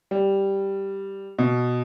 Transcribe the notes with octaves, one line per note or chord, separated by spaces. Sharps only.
G3
B2